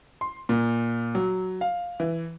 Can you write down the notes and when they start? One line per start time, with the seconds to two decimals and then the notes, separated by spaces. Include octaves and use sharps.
0.21 C6
0.49 A#2
1.15 F#3
1.61 F5
2.00 E3